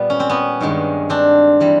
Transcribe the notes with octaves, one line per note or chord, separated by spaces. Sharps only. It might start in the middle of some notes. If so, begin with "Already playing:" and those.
Already playing: A#2 G3 B3
C#4
C4
B3 C#4
G2 D#3 G#3
C4 D4
E3 G3